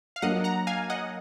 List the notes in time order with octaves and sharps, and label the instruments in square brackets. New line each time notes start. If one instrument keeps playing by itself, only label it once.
[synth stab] F5
[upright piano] F#3 A#3 D4 [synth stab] D#5 F#5
[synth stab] F#5 A#5
F5 G#5
D#5 F#5